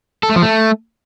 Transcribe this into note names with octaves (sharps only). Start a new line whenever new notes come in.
A4
A3
F3
A3